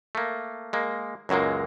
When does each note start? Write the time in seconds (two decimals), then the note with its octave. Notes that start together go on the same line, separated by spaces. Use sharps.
0.15 A3 A#3
0.73 G#3 A#3
1.29 C#2 F#2 F#3 G#3 A#3